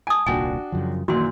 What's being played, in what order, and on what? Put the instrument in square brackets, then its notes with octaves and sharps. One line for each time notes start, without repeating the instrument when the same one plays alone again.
[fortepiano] G#5 [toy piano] A5 D#6
[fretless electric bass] D#1 C2 A#2 [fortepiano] D4 F#4 G5 [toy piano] G#5
[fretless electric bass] F#2 C#3 F3
[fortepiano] F#2 A#2 [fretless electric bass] D#3 E3 [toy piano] F#4 C6